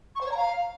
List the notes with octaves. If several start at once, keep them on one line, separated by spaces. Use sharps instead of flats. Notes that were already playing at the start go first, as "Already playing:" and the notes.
C#6
C5
C#5
A#5
F5